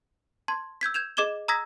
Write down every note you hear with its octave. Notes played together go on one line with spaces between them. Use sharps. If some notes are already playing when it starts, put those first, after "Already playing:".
A5 C6 G#6
E6 G6 G#6 B6
G6 G#6 E7 F7
G#4 D#5 D6 G#6 E7 G7
A#5 D#6 E6 G#6 A#6 B6